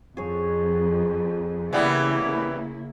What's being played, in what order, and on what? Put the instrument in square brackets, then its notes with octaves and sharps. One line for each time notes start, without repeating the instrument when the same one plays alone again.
[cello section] F2 [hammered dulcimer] G#4 C#5
[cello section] C#3 A#3 E4 [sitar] E3 G3 B3 [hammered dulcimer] F#5